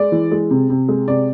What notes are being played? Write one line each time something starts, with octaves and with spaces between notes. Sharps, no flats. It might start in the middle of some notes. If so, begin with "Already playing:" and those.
Already playing: G#3 D5
E3
G#3
C3
C3
G#3
C3 D5